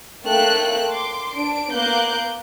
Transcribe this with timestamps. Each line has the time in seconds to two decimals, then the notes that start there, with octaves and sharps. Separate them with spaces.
0.25 A3 A#3 A4 G5 F#6
0.90 C6 D6
1.35 D4 D7
1.72 A#3 B3 A#4 D6 F#6 G6